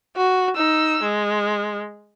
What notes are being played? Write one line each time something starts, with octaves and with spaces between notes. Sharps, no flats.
F#4
D#4 E6
G#3